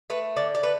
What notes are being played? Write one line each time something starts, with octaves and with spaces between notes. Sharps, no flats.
A3 B4
D3 D5
D5
A3 B4